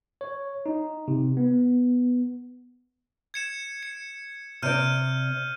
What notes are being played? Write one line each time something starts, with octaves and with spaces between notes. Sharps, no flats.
C#5
D#4
C3
B3
G#6 C#7 E7
C#7
C3 D5 F6 G6 D#7